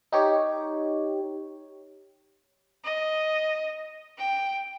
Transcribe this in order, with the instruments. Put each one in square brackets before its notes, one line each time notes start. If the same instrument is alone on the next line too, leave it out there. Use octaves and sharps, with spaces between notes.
[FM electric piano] D#4 G4 C#5
[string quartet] D#5
G5